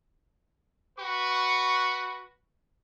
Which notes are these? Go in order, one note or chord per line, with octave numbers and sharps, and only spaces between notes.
F#4 B4 C#6